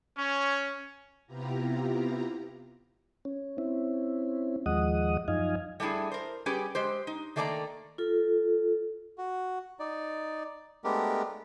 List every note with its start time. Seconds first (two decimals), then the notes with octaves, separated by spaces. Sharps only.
0.17 C#4
1.26 C3 B3 E4 F4 G4 A#5
3.25 C#4
3.58 C4 C#4 E4
4.66 D#2 F3 G#3 D#5 F#5 D#6
5.28 F#2 F3 D#4 D#5 F5 G#5
5.80 G3 A3 D4 E4 G#4
6.12 A#4 C5
6.46 G3 C#4 G4 G#4 B4
6.75 G#3 G4 C5
7.07 D#4
7.36 D#3 A3 A#3 D5 G#5 A#5
7.98 F4 A4
9.18 F#4
9.79 D#4 D5
10.84 G#3 A3 B3 D4 G4 A#4